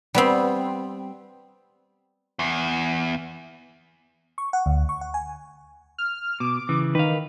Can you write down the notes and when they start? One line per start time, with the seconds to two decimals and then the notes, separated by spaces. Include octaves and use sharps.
0.14 G3 B3 C4
2.39 E2
4.38 C#6
4.53 F#5
4.66 D2
4.89 C#6
5.01 F#5
5.14 G#5
5.98 F6
6.40 B2 D6
6.69 C#3 E3
6.95 D#3 B4 F5